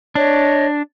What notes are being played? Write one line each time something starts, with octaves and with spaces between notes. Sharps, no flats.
D4 C#5 D#5